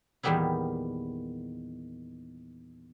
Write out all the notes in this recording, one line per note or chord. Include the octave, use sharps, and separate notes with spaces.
E2 A#2 D#3 G3 B3 E4